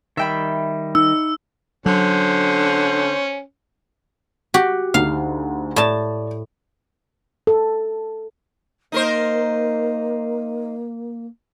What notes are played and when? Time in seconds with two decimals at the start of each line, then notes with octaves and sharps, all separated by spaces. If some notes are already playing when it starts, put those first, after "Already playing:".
0.17 D#3 G3 E5 G5 B5
0.95 D#4 E6
1.86 D3 F#3 C#4 C5
4.54 F#4 G4
4.94 D2 D#4 F5
5.76 A2 D5 A5
7.47 A4
8.92 A#3 D#4 A#4 C5